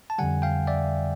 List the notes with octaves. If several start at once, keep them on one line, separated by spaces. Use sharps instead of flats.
A5
F2 D3 G3 F#5 G#5
F5 G5
D5 E5